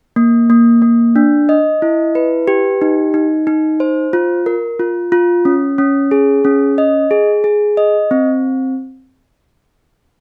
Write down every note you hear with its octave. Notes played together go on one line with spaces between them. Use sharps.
A#3
A#3
A#3
D4
D#5
E4
B4
G4
D#4
D#4
D#4
C5
F4
A#4
F4
F4
C#4
C#4
G#4
C#4
D#5
G#4
G#4
D#5
C4